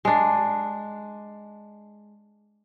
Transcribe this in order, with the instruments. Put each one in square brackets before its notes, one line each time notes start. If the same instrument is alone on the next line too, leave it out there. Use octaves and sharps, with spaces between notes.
[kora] G#3 D4